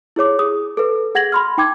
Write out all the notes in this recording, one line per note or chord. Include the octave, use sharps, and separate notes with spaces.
E4 G#4 C#5 D6
G#4 D#6
A4 B4
G#4 F#5 G#6 A#6 F#7
B5 C6 F6
D#4 G5 D6 G#6